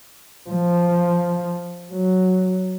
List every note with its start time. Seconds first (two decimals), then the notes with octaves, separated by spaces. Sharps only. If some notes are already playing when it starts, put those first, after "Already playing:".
0.50 F3
1.93 F#3